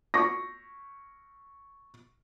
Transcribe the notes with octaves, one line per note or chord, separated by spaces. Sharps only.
C#6 A#6